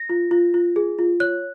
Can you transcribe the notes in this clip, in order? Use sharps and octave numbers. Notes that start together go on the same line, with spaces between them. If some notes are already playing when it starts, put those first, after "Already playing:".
Already playing: A#6
F4
F4
F4
G#4
F4
C#5 F#6